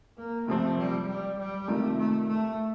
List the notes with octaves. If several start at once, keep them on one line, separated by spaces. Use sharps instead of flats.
A#3
C3 F3 A3 C4
G3
G3
G3
C3 D#3 A3 A#3 F4 A#4
A3
A3